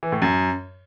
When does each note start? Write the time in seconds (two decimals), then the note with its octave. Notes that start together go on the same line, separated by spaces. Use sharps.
0.03 E3
0.12 A2
0.22 F#2